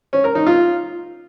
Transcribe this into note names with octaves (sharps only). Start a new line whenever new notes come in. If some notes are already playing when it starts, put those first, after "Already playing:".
C#4
A#4
D#4
F4